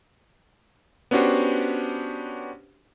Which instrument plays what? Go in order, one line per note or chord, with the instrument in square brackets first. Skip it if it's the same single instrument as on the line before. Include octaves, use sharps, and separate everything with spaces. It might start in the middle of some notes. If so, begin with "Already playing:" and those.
[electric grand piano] B3 C#4 D4 F#4 G4 C5